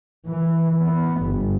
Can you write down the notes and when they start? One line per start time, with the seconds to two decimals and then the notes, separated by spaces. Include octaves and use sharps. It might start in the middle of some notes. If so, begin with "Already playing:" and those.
0.27 E3
0.84 B3
1.22 G1